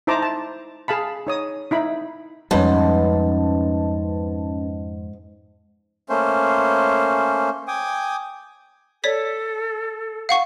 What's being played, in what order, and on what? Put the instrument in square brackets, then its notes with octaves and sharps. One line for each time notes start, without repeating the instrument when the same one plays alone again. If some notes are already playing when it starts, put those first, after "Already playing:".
[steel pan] D#4 E4 C5 A5 A#5 D6
A5
G#4 F5 A5 B5
D#4 C#5 D#6
D#4 E4 B5
[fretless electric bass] F2 G3 [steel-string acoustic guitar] G#2 [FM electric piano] C#4 B4 A5
[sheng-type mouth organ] A3 A#3 C#4 C5
G5 G#5 D6 D#6
[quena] A4 [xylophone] C#5 D5 B6
[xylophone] F5 F#5 C#6